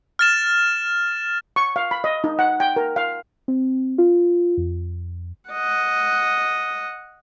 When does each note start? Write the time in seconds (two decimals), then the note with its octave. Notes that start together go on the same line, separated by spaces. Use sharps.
0.19 F6 A6 E7
1.56 C#6
1.76 F5
1.91 B5
2.04 D#5
2.24 D#4
2.39 F#5
2.60 G5
2.76 A#4
2.96 F5
3.48 C4
3.98 F4
4.57 F2
5.50 D#5 F#5